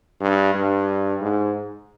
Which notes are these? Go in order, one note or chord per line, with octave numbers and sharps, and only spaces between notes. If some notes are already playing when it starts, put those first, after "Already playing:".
G2
G2
G#2